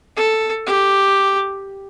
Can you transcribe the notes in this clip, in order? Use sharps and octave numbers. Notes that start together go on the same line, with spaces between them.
A4
G4